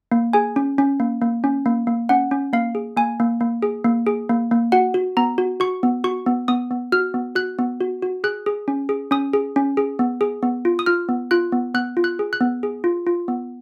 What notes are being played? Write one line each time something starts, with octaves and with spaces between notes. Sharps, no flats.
A#3
G#4 G#5
C#4
C#4
A#3
A#3
C#4
A#3
A#3
C#4 F#5
C#4
A#3 F5
G#4
A#3 G#5
A#3
A#3
G#4
A#3
G#4
A#3
A#3
F#4 F#5
F#4
B3 A#5
F#4
F#4 C#6
B3
F#4 C#6
B3
B3 D#6
B3
F#4 F6
B3
F#4 F#6
B3
F#4
F#4
G#4 F#6
G#4
C#4
G#4
C#4 D#6
G#4
C#4
G#4
B3
G#4
B3
F4
D#6
F4 F6
B3
F4 F#6
B3
B3 F#6
F4
F#6
G#4
F#6
B3
G#4
F4
F4
B3